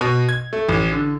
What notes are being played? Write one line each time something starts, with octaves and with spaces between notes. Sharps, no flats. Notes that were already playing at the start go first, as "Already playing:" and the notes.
B2
G#6
A3
A1
D3